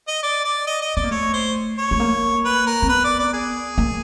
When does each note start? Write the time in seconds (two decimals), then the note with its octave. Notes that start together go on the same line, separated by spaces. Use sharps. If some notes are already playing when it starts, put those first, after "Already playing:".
0.08 D#5
0.23 D5
0.45 D5
0.67 D#5
0.82 D#5
0.97 B3 D5
1.04 A#3
1.11 A3 C#5
1.34 C5
1.78 C#5
1.91 A3
2.00 A#3
2.45 B4
2.67 A#4
2.82 C4
2.89 B3 B4
3.04 D5
3.19 D5
3.33 G#4
3.78 A#3